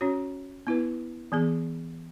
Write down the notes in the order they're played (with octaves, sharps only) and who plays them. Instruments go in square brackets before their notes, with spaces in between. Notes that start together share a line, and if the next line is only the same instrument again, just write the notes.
[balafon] C#4 F#4 C#5
B3 E4 B4
E3 B3 G#4